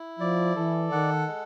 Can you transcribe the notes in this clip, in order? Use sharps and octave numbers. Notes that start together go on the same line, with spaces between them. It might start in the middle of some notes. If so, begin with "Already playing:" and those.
Already playing: E4
F3 D5
E3 A4
D#3 F#5
G#3